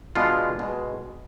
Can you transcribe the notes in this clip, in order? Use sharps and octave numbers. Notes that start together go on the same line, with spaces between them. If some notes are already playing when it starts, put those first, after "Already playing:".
B2 G#3 B3 D4 F4
B2 G#3